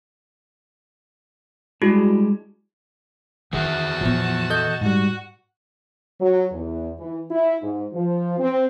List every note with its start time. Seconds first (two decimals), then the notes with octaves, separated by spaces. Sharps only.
1.82 G3 G#3 D4 E4 F#4 G#4
3.53 D#3 E3 F#4 G#4 E5 A5
4.01 A#2 F3 B3
4.50 A4 D#5 G6
4.81 G#2 G3 F#4
6.21 F#3
6.52 E2
6.99 E3
7.31 E4
7.62 G#2
7.93 F3
8.38 C4